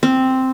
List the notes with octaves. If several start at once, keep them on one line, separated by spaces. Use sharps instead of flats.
C4